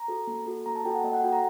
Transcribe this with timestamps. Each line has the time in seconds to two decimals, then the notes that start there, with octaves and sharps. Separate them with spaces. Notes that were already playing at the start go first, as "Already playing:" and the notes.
Already playing: A#5
0.08 F#4 A4
0.27 A#3
0.46 F#4 A4
0.66 A#3 A#5
0.76 A5
0.85 F#4 A4 G5
0.95 F#5
1.04 A#3 D#5
1.13 F#5
1.23 F#4 A4 G5
1.33 A#5